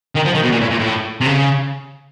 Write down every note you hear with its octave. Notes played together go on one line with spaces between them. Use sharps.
D#3
F3
D#3
B2
A#2
A2
A#2
A2
C3
C#3